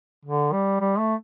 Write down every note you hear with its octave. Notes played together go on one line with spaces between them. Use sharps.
D3
G3
G3
A3